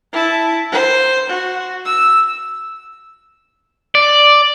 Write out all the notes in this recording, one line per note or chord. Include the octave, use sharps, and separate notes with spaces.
E4 A5
C5
F#4
E6
D5